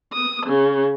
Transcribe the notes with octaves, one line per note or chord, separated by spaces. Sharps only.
D#6
C#3